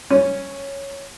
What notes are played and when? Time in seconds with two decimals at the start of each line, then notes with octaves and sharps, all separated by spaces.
0.10 C#4